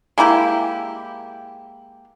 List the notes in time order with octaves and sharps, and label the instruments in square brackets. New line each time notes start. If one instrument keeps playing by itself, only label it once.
[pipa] G#3 A#3 E4 G4